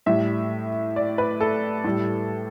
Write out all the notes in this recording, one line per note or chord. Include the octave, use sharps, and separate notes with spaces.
A2 G3 E5
D5
B4
A4
A2 G3